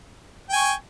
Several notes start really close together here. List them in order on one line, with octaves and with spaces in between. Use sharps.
G5 G#5 C#6